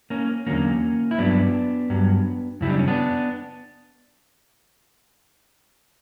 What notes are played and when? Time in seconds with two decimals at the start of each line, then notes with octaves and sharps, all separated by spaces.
0.10 A#3 C#4
0.46 E2 D3 F#3 A#3 C#4
1.11 E4
1.18 G2 F#3 B3 D4
1.90 G2 F#3
2.61 F#2 C#3 G3 E4
2.70 D4
2.79 C#4
2.88 B3 D4